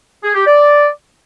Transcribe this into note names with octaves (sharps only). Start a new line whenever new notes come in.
G#4
G4
D5